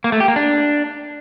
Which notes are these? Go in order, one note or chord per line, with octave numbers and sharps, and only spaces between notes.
A#3
A3
G4
A#3
D4